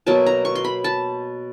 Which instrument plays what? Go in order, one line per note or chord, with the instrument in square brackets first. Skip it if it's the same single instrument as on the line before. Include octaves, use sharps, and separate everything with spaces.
[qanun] B2 F#3 A#3 A5
A#5
C#6
C6
B5
A5